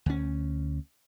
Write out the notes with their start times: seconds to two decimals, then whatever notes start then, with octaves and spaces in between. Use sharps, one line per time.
0.06 D2 C#4